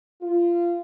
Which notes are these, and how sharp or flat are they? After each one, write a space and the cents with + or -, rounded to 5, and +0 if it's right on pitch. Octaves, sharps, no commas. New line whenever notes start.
F4 -20